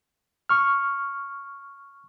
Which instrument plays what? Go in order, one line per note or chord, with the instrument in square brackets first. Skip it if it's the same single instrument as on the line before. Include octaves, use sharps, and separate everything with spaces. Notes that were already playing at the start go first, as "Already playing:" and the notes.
[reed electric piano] C#6 F6